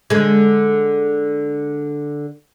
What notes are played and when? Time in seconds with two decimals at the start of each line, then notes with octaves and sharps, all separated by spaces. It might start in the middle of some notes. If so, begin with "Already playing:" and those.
0.10 D3 G#3